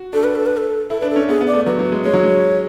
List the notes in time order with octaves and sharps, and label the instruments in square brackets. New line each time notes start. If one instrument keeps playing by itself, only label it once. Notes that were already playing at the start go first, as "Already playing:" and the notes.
Already playing: [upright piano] F#4
[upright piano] D4 [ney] A4
[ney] B4
A4
B4
A4
[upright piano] E4 [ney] A4
[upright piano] D4 [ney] B4
[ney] A4
[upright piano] C#4
[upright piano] B3 [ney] G#4
[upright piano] B3
[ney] D5
[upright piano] A3
[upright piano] F#3 [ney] B4
[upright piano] F#3
G#3
[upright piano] G#3 [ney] C#5
[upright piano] F#3
G#3